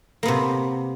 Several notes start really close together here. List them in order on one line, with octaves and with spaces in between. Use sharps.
A#3 B3 C3